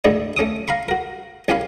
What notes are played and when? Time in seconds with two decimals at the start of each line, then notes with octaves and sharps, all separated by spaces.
0.04 D2 G#2 D3 D#3 E4
0.37 A3 C#4 D6 D#6
0.68 F5 A#5 B5 C#6
0.89 F#4 A#4
1.48 C2 C#4 G4 C#5 F5 B5